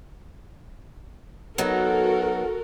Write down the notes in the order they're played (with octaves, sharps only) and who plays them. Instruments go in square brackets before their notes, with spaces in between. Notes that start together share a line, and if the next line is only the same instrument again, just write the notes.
[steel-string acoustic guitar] F#3 B3 D#4 [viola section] F#4 A4 A#4